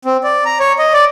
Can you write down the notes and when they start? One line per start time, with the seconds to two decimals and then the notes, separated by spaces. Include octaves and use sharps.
0.05 C4
0.24 D5
0.45 A#5
0.60 C#5
0.79 D#5
0.93 D5